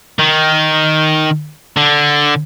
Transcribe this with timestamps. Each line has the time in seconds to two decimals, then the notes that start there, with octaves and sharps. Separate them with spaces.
0.19 D#3
1.77 D3